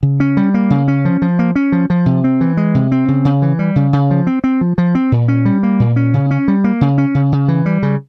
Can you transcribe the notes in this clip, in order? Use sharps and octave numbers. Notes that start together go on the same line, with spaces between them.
C#3
C#4
G3
A#3
C#3
C#4
F3
F3
A#3
C#4
F3
F3
C3
C4
E3
G#3
C3
C4
C#3
C#3
E3
G3
C#3
C#3
F3
C4
C4
F3
F3
C4
A#2
C#4
G3
A#3
A#2
C#4
C#3
C#4
G3
A#3
C#3
C#4
C#3
C#3
E3
G3
C#3